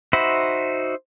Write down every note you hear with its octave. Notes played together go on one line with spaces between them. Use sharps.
D#4 F#4 C5 E5 B5